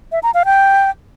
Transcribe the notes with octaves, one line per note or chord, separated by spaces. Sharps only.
E5
A#5
F5
G5